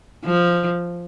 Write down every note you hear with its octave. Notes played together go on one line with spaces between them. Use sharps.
F3